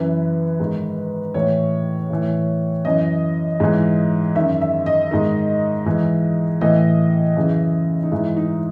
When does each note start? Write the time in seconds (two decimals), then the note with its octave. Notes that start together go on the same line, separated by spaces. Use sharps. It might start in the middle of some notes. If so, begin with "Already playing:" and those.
Already playing: F#2 E3 B4
0.60 G#2 D#3
1.34 A2 E3 C#5
2.10 A2 E3
2.85 F#2 E3 D#5
3.60 G#2 E3
4.35 F#2 D#3 E5
4.61 E5
4.86 D#5
5.11 G#2 D#3
5.86 G#2 E3
6.61 A2 E3 D#5
7.36 F#2 C#3 E3
8.03 D#4
8.11 G#2 E3 E4
8.37 D#4